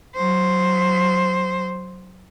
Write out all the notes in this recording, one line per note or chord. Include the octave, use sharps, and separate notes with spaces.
F#3 C5